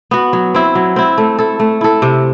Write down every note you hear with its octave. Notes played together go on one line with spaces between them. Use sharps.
B3 F#4
F#3
C4 E4
F#3
C4 E4
A3
E4 A4
A3
E4 A4
C3